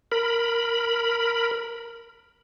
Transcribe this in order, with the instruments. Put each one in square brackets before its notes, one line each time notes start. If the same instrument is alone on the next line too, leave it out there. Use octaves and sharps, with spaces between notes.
[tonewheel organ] A#4 B5